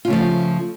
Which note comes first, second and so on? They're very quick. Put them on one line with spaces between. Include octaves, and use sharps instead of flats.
F4 C#3 A3 F3